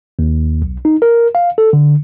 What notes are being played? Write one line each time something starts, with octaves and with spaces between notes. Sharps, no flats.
D#2
B1
D#4
A#4
F5
A4
D3